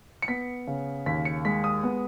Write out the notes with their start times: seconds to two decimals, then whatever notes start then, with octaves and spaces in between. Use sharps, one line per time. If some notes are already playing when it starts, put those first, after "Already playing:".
0.22 C#7
0.28 B3 B6
0.67 C#3
1.06 D#2 B6
1.25 C#7
1.45 G#3 B6
1.64 D#6
1.83 B3